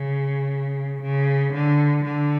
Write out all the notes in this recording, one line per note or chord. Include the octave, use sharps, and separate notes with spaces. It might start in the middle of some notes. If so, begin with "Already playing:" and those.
Already playing: C#3
C#3
D3
D3